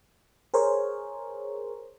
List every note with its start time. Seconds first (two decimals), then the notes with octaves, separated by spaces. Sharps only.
0.54 G#4 A#4 C5 C#5